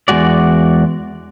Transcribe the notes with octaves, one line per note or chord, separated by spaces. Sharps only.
E2 G#2 G#3 F#4 D5